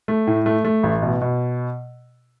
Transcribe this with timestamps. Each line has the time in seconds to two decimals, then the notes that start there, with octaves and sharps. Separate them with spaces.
0.08 A3
0.27 A2
0.46 A3
0.65 A3
0.83 A1
1.02 B2
1.21 B2